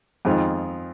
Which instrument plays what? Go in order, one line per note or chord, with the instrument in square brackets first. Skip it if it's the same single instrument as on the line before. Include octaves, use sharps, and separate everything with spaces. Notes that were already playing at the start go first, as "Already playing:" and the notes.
[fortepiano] F2 D#3 G#3 C4 F4